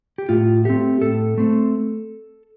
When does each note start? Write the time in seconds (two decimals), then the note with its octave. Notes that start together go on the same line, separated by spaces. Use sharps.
0.18 G4
0.29 A2 F4
0.65 A3 C4 G4
1.01 A2 A4
1.38 A3 C4